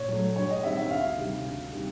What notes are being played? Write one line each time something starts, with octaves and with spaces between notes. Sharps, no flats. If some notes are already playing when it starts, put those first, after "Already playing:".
Already playing: A#2 C#5
F#3 A3
G2 C#5
D#5
D#3 G3 C4 E5
E5
D2 F5
C3 D#3 G3
D2
C3 D#3 G3